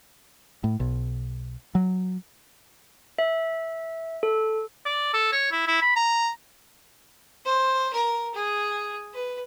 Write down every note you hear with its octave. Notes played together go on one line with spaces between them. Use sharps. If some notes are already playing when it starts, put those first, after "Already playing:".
A2
B1
F#3
E5
A4
D5
A4
C#5
E4
E4
B5
A#5
C5
A#4
G#4
B4